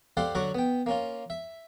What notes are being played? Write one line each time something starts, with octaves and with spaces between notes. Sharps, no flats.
G4 A4 C5 D5 F5 F#5
D3 F#3 F#4 F#5 C#6 D6
B3 G5
A#3 C#4 F4
E5